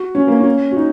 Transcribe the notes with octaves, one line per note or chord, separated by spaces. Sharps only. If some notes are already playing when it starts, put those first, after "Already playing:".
Already playing: F#4
C#4
A#3
C#4
F#4
D#4